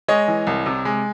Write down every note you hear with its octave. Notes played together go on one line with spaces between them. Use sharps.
G#3 C#5 D#5
E3
C2
C3
G#3